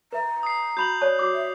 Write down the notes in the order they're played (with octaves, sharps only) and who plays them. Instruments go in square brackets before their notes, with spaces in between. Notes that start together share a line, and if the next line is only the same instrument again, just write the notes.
[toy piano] B4 E5 [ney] A#5
[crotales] D#6 C7
[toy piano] F#4 B5 [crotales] G6 F7 F#7
[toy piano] C#5 D5 A5
F#4 D6
[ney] E5